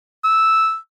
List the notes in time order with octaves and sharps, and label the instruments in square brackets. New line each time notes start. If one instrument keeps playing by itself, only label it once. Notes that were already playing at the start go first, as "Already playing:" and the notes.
[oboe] E6